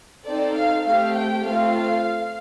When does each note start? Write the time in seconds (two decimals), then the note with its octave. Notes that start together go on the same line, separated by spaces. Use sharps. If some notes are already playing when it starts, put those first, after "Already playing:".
0.24 C4 D#4 A4 D5
0.54 F5
0.83 A3 C4 G4 F5
1.13 G5
1.43 A3 C4 F4 A4 F5